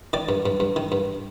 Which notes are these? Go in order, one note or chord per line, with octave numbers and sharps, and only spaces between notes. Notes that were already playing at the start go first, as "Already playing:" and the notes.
D#3 D5
G2
G2
G2
D#3
G2